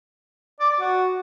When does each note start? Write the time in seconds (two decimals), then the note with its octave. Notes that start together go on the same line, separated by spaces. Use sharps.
0.60 D5
0.70 D5
0.80 F#4